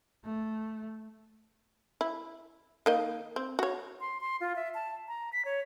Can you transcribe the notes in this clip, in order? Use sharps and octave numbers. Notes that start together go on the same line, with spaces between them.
A3
E4
D#3 A#3 D#5
C4
F#4 C#5
C6
C6
F4
E5
A5
A#5
B6
C#5